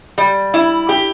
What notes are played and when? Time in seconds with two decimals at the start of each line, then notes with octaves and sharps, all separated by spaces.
0.18 G3
0.54 E4
0.89 G4